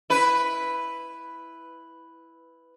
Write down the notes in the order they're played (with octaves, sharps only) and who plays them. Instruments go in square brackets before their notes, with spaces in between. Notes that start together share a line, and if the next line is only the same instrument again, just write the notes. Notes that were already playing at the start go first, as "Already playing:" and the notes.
[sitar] E4 B4